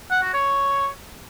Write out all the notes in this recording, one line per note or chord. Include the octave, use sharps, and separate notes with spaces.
F#5
F#4
C#5